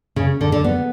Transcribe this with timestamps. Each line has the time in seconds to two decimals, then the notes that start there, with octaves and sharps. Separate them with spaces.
0.16 C#3
0.41 D3
0.52 D3
0.64 B3